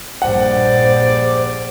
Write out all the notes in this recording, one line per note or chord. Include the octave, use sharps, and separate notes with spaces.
A#1 G2 G3 G#4 C5 D5 F#5